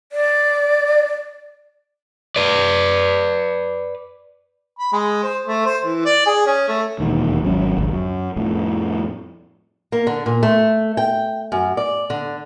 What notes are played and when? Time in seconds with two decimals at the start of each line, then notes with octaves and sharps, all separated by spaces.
0.12 D5
2.36 B4 D5
4.79 B5
4.93 G#3
5.23 C5
5.47 A3
5.66 C5
5.84 E3
6.05 D5
6.26 G#4
6.46 C#4
6.68 A3
7.00 E1 A#1 D#2 D#3
7.43 G#1 F#3 C#4
7.77 G#1 C#2
7.91 F#2
8.36 F2 A2
9.92 A#3
10.07 D3
10.26 A#2
10.43 A3
10.97 G5
11.52 F#2
11.77 D5
12.10 D3